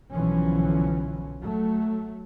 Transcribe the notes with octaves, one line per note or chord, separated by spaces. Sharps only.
B1 D3 E3 F3 C#4
F#3 A3